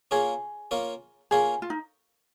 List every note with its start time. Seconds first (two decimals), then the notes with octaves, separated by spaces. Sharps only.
0.11 A#3 C#4 F4 G#4 A#4 C#5
0.71 A#3 C#4 F4 A#4 C#5
1.31 A#3 C#4 F4 G#4 A#4 C#5
1.62 F4
1.70 D#4